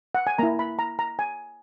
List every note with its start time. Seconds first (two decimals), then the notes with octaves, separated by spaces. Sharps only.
0.15 F#5
0.27 G#5
0.38 A#3 E4 A#5
0.59 B5
0.79 A#5
0.99 A#5
1.19 G#5